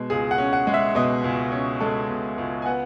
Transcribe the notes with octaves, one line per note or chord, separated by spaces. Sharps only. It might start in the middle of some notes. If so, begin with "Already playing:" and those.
Already playing: B2 G#3
C#2 G#4
F#5
C#4
F#5
G#3
E5
B2 D#5
C#2
C#4
G#3 A4
B2
C#2
G#5
B3 F#5